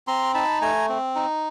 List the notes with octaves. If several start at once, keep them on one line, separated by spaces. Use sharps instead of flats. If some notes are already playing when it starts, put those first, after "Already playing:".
C4 A#5 C6
D#4 A5 B5
A3 G#5 A#5
C4
D#4